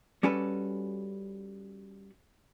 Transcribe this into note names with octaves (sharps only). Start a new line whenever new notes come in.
G3 C#4 F#4 A4 B4